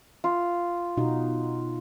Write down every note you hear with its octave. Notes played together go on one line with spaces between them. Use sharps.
F4
B2 D#4 F#4